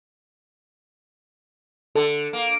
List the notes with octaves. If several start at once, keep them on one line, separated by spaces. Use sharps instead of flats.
D3 A4
A#3